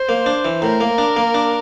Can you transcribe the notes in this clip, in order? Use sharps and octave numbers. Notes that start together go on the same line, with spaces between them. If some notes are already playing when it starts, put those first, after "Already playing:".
Already playing: C5
A#3
D4
E3
A2 A#4
A#3
D4
A#3
D4